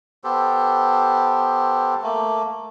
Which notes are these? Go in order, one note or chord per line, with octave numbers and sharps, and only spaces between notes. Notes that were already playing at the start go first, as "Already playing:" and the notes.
B3 G4 A4 C5
A3 A#3